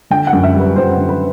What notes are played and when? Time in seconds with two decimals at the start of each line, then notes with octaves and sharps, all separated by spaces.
0.10 D3 G5
0.27 F#5
0.33 F#2
0.43 E5
0.54 G3
0.60 B4
0.76 F#2 C5
0.97 D3
1.09 B4